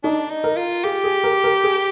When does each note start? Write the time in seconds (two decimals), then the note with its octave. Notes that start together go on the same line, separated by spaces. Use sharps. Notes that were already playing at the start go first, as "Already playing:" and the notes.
0.04 D4 D#4
0.30 D#4
0.44 A#4
0.57 F4
0.84 G4 G#4
1.04 G#4
1.24 A#4
1.44 A#4
1.64 G#4